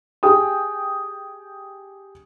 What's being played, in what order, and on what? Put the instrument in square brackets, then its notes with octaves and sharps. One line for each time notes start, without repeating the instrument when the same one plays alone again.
[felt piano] G4 G#4 G5 D#6